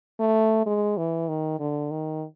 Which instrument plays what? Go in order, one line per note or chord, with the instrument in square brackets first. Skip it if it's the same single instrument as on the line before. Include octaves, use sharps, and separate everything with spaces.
[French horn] A3
G#3
E3
D#3
D3
D#3